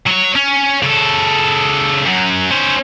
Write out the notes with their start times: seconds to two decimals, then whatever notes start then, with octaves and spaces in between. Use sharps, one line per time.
0.07 F#3 C#5
0.36 C#4
0.83 C#3 A4
2.06 F#2 F#3
2.51 C#4 C5